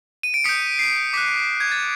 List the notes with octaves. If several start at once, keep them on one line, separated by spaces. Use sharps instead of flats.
D#7
D7
D#6 G6 B6 C#7
C7
D6 F#6 B6
G#6
A6